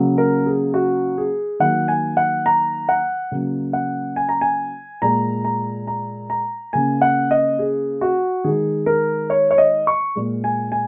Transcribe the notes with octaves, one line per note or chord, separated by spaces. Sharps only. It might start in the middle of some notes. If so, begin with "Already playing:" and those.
Already playing: C#3 F#3 A#3
A#4
G#4
F#4
G#4
D#3 F#3 A#3 F#5
G#5
F#5
A#5
F#5
C#3 F#3 A#3
F#5
G#5
A#5
G#5
A#2 G#3 A#5
A#5
A#5
A#5
C#3 A#3 G#5
F#5
D#5
G#4
F#4
D#3 G#3 G#4
A#4
C#5
C#5
D#5
C#6
A#2 G#3
G#5
G#5